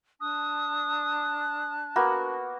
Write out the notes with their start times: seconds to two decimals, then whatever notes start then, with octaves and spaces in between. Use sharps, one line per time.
0.21 D4 A5 D#6 F#6
1.96 A#3 B3 F#4